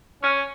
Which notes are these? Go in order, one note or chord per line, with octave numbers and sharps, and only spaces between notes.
C#4